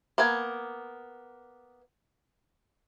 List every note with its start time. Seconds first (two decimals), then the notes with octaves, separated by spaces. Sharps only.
0.18 A#3 B3 G#5